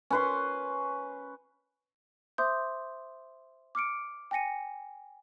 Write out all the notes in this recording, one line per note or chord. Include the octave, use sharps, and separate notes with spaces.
C#4 B4 C6
C5 E5 C6 D6 D#6 G6
D6 F6 C#7 D7
G5 G#5 A#6 C#7 D#7